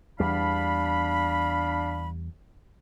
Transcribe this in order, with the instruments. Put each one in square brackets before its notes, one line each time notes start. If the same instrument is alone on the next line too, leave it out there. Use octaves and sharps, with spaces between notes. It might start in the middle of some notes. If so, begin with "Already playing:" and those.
[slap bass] E2 G3 [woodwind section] D4 F5 B5